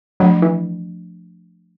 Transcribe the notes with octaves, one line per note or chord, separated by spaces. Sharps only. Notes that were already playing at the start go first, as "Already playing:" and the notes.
F3 F#3 A3 D4
E3